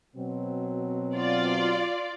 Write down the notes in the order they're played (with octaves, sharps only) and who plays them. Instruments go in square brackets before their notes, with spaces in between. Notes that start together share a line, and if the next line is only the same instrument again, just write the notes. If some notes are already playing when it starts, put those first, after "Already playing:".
[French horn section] B2 F#3 C4
[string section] F4 D5